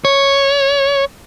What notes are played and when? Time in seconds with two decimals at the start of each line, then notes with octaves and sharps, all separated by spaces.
0.05 C#5